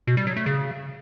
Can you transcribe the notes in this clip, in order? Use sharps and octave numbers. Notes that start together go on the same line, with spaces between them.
B2
G3
F#3
A3
C#3